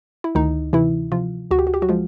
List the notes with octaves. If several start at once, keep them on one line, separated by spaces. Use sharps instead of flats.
E4
D2 D#3 D#4
C3 E3 E4
C3 F3 F4
D2 F#4
G4
F#4
G4
F#3 F#4
F3 G#3 F4